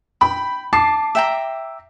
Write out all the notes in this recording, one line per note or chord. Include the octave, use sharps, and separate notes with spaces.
G5 B5
A5 D6 C7
E5 G5 A#5